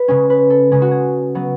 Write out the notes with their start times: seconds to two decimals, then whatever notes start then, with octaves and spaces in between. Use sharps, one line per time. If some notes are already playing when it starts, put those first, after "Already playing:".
Already playing: B4
0.08 C#3 G#3 C#4
0.30 B4
0.50 A4
0.71 C#3 G#3 C#4 G#4
0.82 F#4
0.91 G#4
1.35 F#3 B3